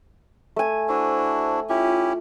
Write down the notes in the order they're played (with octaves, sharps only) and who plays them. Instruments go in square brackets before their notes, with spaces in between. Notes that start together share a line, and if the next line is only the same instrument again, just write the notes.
[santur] A3 G#5
[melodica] D4 E4 F#4 [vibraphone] C5 A5 E6
[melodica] C#4 E4 G4 [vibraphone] F4